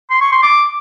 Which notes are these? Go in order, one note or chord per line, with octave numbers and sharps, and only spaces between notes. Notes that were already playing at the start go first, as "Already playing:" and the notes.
C6
C#6
C6
D6